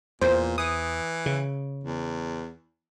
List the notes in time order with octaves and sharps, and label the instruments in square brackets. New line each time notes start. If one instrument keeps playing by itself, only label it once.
[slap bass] E2 [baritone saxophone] A#2 [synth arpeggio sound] C5
[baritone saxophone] E3 [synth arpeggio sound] D#6
[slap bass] C#3
[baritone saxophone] E2